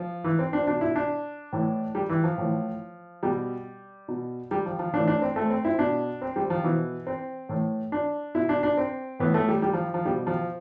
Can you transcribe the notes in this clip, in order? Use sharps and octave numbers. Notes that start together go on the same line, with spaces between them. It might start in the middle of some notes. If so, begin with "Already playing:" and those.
Already playing: F3
E3
C4
D4
B2 D4
E4
D4
A2 E3
G3
E3
F3
A2 E3
B2 G3
B2
G3
F3
F3
A2 E3 D4
D4
C4
A3
C4
E4
B2 D4
C4
G3
F3
B2 E3
C4
A2 E3
D4
B2 E4
D4
D4
C4
A2 E3 B3
A3
G3
G3
F3
F3
B2 G3
F3